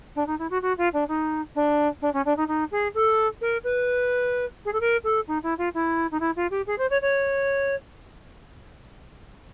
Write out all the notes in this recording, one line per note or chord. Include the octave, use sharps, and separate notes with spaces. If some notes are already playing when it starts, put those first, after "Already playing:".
D4
D#4
E4
F#4
F#4
F4
D4
D#4
D4
D4
C#4
D4
D#4
D#4
G#4
A4
A#4
B4
G#4
A4
A#4
A4
D#4
E4
F4
E4
D#4
E4
F4
G4
G#4
C5
C#5
C#5